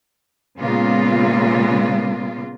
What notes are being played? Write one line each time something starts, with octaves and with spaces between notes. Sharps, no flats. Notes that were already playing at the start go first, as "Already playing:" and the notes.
A#2 C#3 G#3 A#3 B3 F4